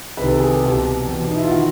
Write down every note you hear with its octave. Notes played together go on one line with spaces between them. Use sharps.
C2 C3 D#3 B4
A4
G#4
G4
C2 B2
E2
B2
D#4
E4
F4
F#4
D#3